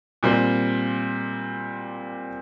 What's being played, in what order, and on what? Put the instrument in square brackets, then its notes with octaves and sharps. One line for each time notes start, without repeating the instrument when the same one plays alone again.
[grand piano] A#2 G3 C4